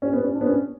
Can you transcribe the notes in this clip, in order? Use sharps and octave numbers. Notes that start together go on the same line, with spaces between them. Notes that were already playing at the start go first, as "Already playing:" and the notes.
C#4
B3
C#4
D4
B3
C#4